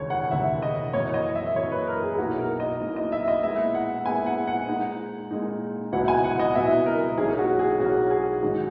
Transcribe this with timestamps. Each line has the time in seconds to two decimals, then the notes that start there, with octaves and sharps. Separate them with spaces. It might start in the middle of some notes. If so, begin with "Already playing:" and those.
Already playing: E1 D#2 C#3 C#5
0.10 F#5
0.31 E1 D#2 C#3 E5
0.62 D#5
0.93 F#2 E3 A#3 C#5
1.14 D#5
1.35 E5
1.56 F#2 E3 A#3 C#5
1.72 B4
1.87 A#4
2.03 G#4
2.14 G#4
2.18 B1 B2 A#3 E4 F#4
2.39 A#4
2.60 D#5
2.81 B1 B2 A#3 E4
2.96 D#5
3.12 E5
3.28 D#5
3.43 A#2 G#3 B3 E4 E5
3.75 F#5
4.05 A#2 G#3 B3 E4 G#5
4.26 F#5
4.47 F#5
4.68 A#2 G#3 D#4
5.31 A#2 G#3 D#4
5.92 C#2 B2 F#3 B3 E4 F#5
6.08 G#5
6.24 F#5
6.39 D#5
6.55 C#2 B2 F#3 B3 E4 E5
6.86 A#4
7.18 B1 A#2 A#3 C#4 G#4
7.39 F#4
7.59 G#4
7.79 B1 A#2 A#3 C#4 F#4
8.11 G#4
8.42 G#2 D#3 F#3